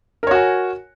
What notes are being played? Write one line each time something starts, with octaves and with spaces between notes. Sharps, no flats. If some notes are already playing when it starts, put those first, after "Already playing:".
F#4 A#4 C#5 G#5